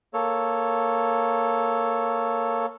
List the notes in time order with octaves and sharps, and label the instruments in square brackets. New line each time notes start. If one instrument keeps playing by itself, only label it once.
[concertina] A#3 A4 C#5